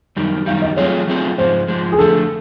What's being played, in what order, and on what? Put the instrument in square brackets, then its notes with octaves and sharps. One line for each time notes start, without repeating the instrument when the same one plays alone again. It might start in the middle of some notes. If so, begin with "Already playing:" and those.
[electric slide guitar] F#2 D#3 G3
[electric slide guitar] F#2 D#3 G3 [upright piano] F5
[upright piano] D#5
[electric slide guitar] F#3 A3 C4 F4 G#4 [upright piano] C#5
[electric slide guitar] F#3 A3 C4 F4 G#4
[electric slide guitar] G#2 F3 G#3 [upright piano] C5
[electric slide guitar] G#2 F3 G#3
[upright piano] G#4
[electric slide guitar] D3 F3 A3 [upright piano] A4